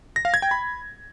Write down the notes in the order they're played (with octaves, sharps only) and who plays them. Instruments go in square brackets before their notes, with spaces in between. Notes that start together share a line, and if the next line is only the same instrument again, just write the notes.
[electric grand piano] A#6
F5
G#6
G5
B5